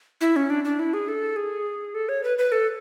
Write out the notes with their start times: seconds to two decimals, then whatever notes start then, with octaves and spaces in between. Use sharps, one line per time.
0.21 E4
0.36 C#4
0.50 D4
0.65 D4
0.79 E4
0.94 G#4
1.08 A4
1.36 G#4
1.95 A4
2.09 C#5
2.24 B4
2.38 B4
2.52 A4